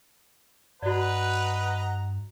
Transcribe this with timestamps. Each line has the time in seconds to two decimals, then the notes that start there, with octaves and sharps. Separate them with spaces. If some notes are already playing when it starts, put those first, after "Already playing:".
0.82 G2 F#4 B4 D5 D#5 F#5 A#5